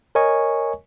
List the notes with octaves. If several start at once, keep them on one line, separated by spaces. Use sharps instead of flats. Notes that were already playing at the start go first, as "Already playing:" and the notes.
A#4 C#5 D#5 G#5 C#6